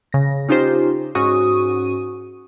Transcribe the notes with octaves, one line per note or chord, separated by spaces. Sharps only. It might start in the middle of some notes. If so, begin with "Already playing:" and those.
C#3 A#6
C#4 D#4 F4 G4 C5
G#2 C#4 F#4 C#6 D#6 D#7